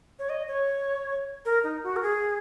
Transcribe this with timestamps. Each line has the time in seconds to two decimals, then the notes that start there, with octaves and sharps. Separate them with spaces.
0.19 C#5
0.29 D#5
0.48 C#5
1.45 A#4
1.63 D#4
1.83 F#4
1.96 A#4
2.03 G#4